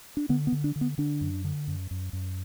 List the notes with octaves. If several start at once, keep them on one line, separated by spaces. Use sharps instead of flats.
D4
D3 B3
B3
D3
D4
D3
B3
D3 D4
F#2
D3
F#2
F#2
F#2